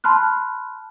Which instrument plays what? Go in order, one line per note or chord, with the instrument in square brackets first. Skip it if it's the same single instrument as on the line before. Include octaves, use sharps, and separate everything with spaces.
[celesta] A5 B5 C6 F6 F#6